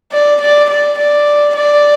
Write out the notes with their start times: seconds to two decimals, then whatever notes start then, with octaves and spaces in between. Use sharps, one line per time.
0.12 D5
0.41 D5
0.69 D5
0.98 D5
1.55 D5